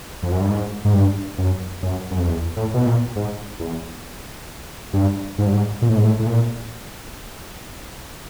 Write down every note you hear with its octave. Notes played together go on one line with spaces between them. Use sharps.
F2
F#2
G2
G#2
G#2
G2
F#2
F#2
F#2
F2
E2
A2
B2
A#2
G#2
E2
G2
G#2
G2
G#2
A#2
A2
G#2
A2
A2
A#2